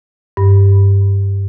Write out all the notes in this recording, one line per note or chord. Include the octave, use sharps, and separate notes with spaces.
G2